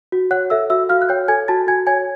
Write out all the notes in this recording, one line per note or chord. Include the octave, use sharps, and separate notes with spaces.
F#4
C#5 F#5 F#6
A4 E5 E6
F#4 E5 E6
F#4 F5 F6
F#6
C#5 G5 G6
A4 G#5 G#6
F#4 A5 A6
F#4 G#5 G#6
C#5 G#5 G#6